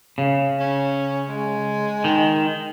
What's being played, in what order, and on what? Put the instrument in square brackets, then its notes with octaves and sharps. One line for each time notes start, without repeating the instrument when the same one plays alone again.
[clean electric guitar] C#3
[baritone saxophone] C#4
G#3
[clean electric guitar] D#3